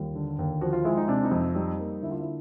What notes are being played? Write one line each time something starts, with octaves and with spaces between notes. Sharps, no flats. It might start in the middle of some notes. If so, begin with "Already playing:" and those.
Already playing: D#2 G3 F4
D3
D#2
F3 F#4
F4
G#3 E4
D#4
C3 D4
D#4
F2
G3 D#4
A#3
D3 E4
F4
E4